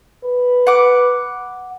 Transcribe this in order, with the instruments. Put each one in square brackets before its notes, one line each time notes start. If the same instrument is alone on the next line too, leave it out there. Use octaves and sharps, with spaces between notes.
[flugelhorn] B4
[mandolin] F#5 D6